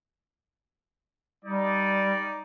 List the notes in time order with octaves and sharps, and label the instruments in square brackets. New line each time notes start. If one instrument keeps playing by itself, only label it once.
[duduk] G3 [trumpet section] D#4 D5